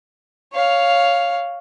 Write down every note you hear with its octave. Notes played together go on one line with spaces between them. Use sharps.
C#5 F5